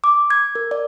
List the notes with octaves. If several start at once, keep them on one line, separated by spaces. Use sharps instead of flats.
D6
G#6
A#4
D5